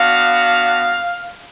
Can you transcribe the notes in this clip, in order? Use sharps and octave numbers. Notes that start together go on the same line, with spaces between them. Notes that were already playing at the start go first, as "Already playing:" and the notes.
Already playing: B3 D4 F#4 F5